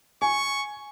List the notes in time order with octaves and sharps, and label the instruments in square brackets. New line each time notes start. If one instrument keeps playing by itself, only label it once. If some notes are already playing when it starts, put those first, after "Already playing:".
[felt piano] G#5 [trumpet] C#6